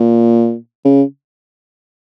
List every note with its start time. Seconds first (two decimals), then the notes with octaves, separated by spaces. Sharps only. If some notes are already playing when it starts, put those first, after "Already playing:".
Already playing: A#2
0.85 C#3